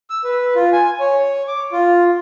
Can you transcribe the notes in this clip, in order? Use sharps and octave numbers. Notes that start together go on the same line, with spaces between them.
E6
B4
F4
G#5
C#5
D6
F4